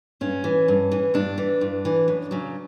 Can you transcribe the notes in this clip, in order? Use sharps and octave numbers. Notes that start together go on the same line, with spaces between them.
G2 C#4
E3
G2
E3
G2 D4
E3
G2
E3
F#2
C#3 F#3